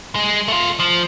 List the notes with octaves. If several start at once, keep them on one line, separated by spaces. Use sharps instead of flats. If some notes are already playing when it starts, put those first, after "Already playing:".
G#3
A3 F4
F3